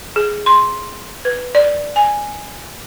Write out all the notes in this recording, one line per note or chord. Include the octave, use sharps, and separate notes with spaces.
G#4
C6
B4
D5
G#5